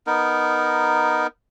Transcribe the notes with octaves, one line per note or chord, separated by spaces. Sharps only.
B3 D#4 A#4